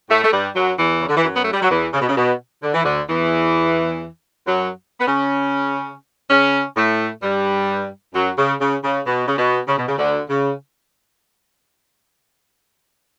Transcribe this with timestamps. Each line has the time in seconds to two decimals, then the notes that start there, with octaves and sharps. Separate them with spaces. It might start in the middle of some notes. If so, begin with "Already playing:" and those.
0.10 A2 A3
0.24 A3
0.32 G2 G3
0.55 F#2 F#3
0.78 E2 E3
1.00 C#3
1.08 D3
1.16 E3
1.24 F#2 F#3
1.35 B3
1.44 A3
1.53 G3
1.62 F#3
1.70 E2 E3
1.93 C#3
2.01 B2
2.09 C#3
2.17 B2
2.63 D3
2.74 E3
2.84 D2 D3
3.09 E2 E3
4.46 F#2 F#3
5.00 B3
5.07 C#3 C#4
6.30 C#3 C#4
6.77 A2 A3
7.23 G2 G3
8.14 F#2 F#3
8.38 C#3
8.60 C#3
8.84 C#3
9.06 B2
9.27 C#3
9.38 B2
9.68 C#3
9.78 B2
9.88 C#3
9.98 D2 D3
10.30 C#3